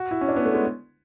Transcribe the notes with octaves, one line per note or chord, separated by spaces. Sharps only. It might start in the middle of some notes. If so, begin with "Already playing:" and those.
Already playing: F#4
E4
C#4
D4
B3
A3
G#3